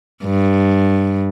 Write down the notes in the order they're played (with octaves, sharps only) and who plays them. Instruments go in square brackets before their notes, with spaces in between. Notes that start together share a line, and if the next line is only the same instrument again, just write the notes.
[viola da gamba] G2